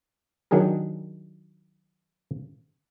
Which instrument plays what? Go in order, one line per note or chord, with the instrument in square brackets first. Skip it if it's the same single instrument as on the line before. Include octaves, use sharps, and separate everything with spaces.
[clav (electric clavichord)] D#3 F#3 D4 G4 G#4 A#4